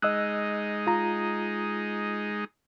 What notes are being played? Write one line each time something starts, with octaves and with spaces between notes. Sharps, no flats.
G#3 D#4 D#5 E6 F#6
F4 A#5